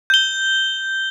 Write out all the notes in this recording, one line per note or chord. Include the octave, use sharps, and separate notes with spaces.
G6 G7